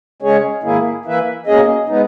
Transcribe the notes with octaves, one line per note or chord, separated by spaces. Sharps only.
C#3 G#3 C#4 G#4 C#5
G#2 D#3 A#3 E4 G#4
E3 A#3 E4 B4 E5
B2 A#3 C#4 G#4 D#5
G#3 B3 D#4